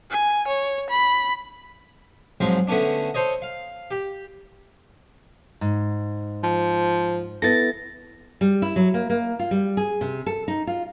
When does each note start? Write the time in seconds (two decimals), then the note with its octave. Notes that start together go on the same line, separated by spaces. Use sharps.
0.11 G#5
0.48 C#5
0.90 B5
2.40 G#2 F3 F#3 G#3 C4
2.67 D3 A3 B3 C#4 D4
3.14 A4 C5 C#5 D#5
3.42 F5
3.91 G4
5.61 G#2
6.43 F3
7.42 B3 E4 A4 A6 A#6
8.41 G3
8.62 E4
8.76 F#3
8.94 A#3
9.10 A#3
9.39 F4
9.51 G3
9.77 G#4
10.01 C3
10.26 A4
10.48 D#4
10.67 F4